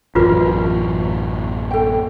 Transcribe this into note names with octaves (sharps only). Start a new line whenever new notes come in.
A1 F#2 E3 F4 F#4 A#4 B4
A4 G5